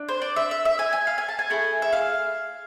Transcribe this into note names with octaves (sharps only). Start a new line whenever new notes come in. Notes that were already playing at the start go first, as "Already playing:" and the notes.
Already playing: D4
C5
D5
E5
E5
E5
G#5
G#5
F5
G#5
A5
G#5
A3 E4 G#4
E5
F5